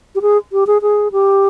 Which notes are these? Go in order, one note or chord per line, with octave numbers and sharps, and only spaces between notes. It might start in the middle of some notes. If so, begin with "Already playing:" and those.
G4
G#4
G4
G#4
G#4
G4